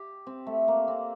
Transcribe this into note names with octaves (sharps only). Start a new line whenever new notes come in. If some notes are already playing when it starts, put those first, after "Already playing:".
Already playing: G4
C4
A3
A#3
C4